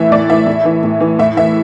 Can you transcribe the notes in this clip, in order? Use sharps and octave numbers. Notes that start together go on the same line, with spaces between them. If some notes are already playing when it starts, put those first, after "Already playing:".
Already playing: A2 E3 E5
A2 D5
E3 E5
A2
E3
A2
E3
A2 E5
E3 E5